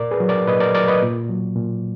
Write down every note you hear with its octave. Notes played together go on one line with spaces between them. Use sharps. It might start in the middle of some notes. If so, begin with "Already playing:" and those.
Already playing: A#2 A#4 D5
G#4 B4
F#3
A#4 D5
A#2 B4 D#5
A#4 D5
F#3 A#4 D5
B4 D#5
A#2
F#3
A#2